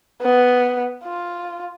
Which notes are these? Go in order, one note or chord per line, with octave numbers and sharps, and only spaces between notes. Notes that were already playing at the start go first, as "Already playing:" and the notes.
B3
F4